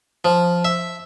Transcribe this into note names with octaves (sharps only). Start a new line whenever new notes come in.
F3
E5